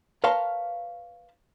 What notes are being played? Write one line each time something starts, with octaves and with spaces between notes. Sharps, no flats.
A#4 B4 C#5 F5 A5 C6